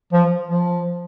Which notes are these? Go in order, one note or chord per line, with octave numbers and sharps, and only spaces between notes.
F3
F3